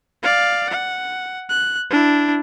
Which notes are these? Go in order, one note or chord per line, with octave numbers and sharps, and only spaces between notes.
D5 F5
F#5
F#6
D4 E4